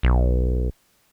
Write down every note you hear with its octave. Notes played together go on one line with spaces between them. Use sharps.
B1